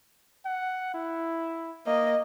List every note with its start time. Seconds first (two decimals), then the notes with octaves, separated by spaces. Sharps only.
0.45 F#5
0.94 E4
1.87 A#3 D#5